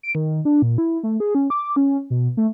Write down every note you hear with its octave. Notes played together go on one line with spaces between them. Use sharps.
D7
D#3
D4
A#2
E4
A3
G#4
C#4
D6
C#4
B2
A3